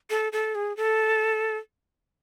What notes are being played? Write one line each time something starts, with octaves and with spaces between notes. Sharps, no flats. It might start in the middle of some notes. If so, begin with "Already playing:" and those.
A4
A4
G#4
A4